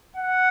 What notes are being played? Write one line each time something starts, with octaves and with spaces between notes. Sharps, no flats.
F#5